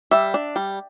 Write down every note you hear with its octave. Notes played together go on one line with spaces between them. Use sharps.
G3 E5
D4
G3